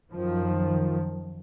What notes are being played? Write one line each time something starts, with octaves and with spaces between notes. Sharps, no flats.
F#2 D#3 F3